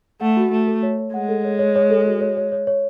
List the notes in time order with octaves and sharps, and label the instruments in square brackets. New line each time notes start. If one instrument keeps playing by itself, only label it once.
[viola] A3 [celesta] F#5
[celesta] F#4
[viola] A3 [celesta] F#4
[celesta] A4
C#5
C#5
[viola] G#3 [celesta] F#5
[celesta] A4
C#5
C#5
C#5
A4
F#4
C#5
C#5
C#5
C#5